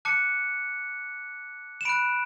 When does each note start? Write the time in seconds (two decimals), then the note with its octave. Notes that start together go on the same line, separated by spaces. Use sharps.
0.05 A5 D6 F#6 C#7
1.81 E7
1.85 B5 F#6 D7